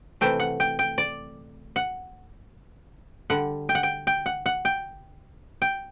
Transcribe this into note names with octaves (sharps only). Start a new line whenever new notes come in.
C3 E3 A3 G5
F#5
G5
G5
D5
F#5
D3 G3 F#5
G5
F#5
G5
G5
F#5
F#5
G5
G5